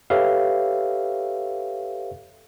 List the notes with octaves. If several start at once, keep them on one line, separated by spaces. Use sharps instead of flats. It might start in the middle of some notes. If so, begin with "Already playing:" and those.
G4 A4 B4 C#5 E5 F5